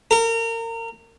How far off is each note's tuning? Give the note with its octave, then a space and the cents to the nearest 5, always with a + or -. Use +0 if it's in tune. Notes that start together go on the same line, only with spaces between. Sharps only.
A#4 -30